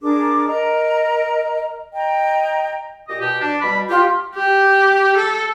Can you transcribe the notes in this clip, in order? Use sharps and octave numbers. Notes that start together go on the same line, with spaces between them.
D4 G#4 A#4 D6
A#4 D#5 A#5
D#5 G5 A#5
A#2 G4 D#5
B2 G4
D4
B2 G3 B5
F4 G4
G4
A4